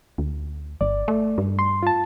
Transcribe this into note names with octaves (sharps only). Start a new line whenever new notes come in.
D2
G1 D5
A3
G2
C6
F4 A5